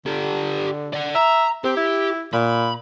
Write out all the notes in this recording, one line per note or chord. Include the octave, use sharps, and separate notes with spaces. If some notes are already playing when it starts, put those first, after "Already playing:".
D3 G4 A4
D5 F#5
E5 A#5
C4 G4
E4
A#2 B5